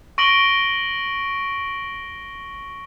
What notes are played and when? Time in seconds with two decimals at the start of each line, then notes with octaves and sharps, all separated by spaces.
0.18 C#6 A#6 D7 F#7 G7